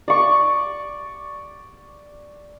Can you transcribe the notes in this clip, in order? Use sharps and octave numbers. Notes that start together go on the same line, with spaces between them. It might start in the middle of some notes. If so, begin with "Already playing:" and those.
D5 C#6